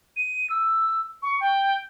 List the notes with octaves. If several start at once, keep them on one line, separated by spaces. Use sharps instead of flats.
D#7
E6
C#6
G5